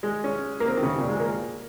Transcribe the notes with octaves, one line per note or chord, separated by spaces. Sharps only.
G#3
C#4
A#3
C4
D#3
C#3
A#2
G#3
A#3